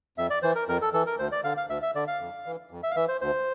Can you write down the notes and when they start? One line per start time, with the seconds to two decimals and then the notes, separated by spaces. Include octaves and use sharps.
0.18 F2 E5
0.30 D5
0.43 E3 C5
0.55 A#4
0.68 F2 A#4
0.82 A4
0.93 E3 A4
1.07 A#4
1.19 D2 C5
1.32 D5
1.44 D3 F5
1.57 F5
1.69 D2 E5
1.82 E5
1.95 D3 D5
2.07 F5
2.20 F2
2.46 E3
2.71 F2
2.83 E5
2.91 F5
2.96 E3 E5
3.08 C5
3.21 D2 C5